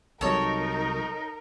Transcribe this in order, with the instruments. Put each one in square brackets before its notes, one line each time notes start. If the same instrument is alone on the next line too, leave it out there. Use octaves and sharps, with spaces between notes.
[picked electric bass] C2 C3 F#3 [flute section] D#4 [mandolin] A4 C#5 [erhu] A#4